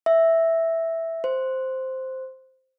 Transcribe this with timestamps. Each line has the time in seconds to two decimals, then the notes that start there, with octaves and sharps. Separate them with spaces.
0.06 E5
1.24 C5